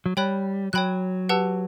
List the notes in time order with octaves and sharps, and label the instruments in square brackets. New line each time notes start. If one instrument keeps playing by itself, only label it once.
[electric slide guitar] F#3
[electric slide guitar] G3 [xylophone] C#5 G5 B5 F#6
[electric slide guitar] F#3 [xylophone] C#5 G5 B5 F#6
[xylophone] G4 B4 F#5 A5 E6